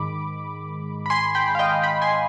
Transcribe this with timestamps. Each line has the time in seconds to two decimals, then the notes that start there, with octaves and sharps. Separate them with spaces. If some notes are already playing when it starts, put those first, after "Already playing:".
Already playing: G#2 D#3 G#3 B5 D6
1.06 B5
1.10 G#5 C6
1.35 G5 B5
1.55 F5
1.59 D#5 G5
1.83 G5 B5
2.02 G#5 C6